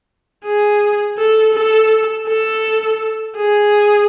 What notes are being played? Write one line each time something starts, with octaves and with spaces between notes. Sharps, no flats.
G#4
A4
A4
A4
G#4